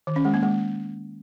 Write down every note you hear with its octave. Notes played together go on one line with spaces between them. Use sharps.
D#3
C#4
G#3
A#3
G#3